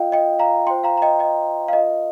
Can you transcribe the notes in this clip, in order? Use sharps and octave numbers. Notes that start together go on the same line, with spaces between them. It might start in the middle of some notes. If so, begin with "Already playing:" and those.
Already playing: F4 A#4 D#5 F5 G5
D#5 G5
F5 A#5
F4 C5 G5 C6
F5 A#5
A#5
D#5 G5
D#5 G5
F5
F4 A#4 D#5